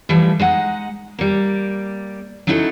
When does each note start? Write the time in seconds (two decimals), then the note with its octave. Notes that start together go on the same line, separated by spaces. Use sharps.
0.09 E3 F3 G3 A3
0.40 G#3 D#4 F#5
1.19 G3 A#3
2.47 F#3 C#4 D#4 E4 F#4 A4